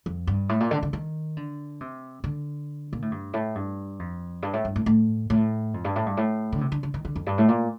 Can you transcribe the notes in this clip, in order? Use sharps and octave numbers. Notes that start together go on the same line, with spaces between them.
F2
G2
A2
A#2
D3
D3
D#3
D3
C3
D3
A#2
A2
G2
A2
G2
F2
G2
A2
G2
A2
A2
A2
F2
G2
A2
G2
A2
D3
C3
D3
D3
D#3
D3
F2
G2
A2
A#2